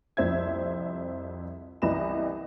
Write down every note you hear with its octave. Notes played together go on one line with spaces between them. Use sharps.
C2 F2 C5 E5 G#6
C2 E3 D#5 B5 E7